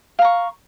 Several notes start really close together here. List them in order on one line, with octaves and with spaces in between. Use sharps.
F5 A#5 C#6